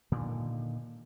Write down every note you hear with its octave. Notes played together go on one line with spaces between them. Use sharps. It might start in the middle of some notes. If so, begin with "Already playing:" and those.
A#2 D3 D#3